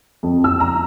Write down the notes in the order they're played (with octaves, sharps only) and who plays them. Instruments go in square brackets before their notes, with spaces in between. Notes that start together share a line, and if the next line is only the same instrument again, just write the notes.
[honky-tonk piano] F2
E6
A#5